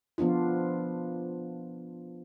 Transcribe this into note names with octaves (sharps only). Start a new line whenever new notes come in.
F3 B3 D4 F4